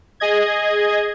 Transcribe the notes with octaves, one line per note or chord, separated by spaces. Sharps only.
G#4 D#5 G#6